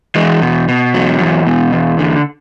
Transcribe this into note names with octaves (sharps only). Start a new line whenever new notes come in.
E2 E3 G#3
B2
B2
E2 F#3
E2
B2
E2
D3